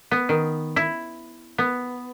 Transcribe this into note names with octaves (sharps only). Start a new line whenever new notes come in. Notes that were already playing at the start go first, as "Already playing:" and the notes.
B3
D#3
E4
B3